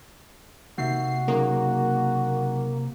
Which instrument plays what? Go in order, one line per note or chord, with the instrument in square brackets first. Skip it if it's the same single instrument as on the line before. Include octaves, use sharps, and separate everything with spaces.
[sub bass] C3 [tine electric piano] A#3 D#4 E5 [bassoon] F#4 [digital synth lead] C7
[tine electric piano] C#3 F#3 D#4 [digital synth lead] A#3